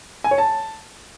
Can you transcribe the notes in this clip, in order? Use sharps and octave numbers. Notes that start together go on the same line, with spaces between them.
G#5
C#5
A5